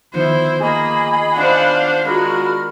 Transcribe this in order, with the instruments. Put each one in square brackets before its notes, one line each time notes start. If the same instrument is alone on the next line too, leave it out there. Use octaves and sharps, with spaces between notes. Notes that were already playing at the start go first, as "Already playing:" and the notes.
[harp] D#3 F3 B3 [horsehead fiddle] E4 C5
[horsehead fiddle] A#3 [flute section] G#4 D#5 B5
[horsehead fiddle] D4 C5 [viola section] D5 F5 F#5
[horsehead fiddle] G#3 F4 [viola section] D4 F#4 [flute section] A#4 B5 F6